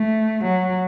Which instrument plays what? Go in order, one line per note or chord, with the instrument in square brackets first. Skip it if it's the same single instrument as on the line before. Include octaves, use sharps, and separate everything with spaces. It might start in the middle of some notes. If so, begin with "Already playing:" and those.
Already playing: [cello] A3
F#3